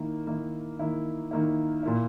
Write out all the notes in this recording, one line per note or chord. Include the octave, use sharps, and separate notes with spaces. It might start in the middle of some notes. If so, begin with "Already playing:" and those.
Already playing: D#3 A#3 E4
D#3 A#3 E4
D#3 A#3 E4
D#3 A#3 E4
A#2 A#3 E4